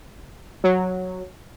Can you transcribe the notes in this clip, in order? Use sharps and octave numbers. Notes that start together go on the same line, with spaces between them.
F#3